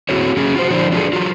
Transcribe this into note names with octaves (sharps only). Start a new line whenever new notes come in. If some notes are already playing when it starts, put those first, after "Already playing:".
C4 E4 F#4 G#4 A4 C#5
F#3 C#4 G#4
F4 F#4 C5
D3 F3 D4 E4 C5
D4 F4 F#4 G#4 A4
F#3 F4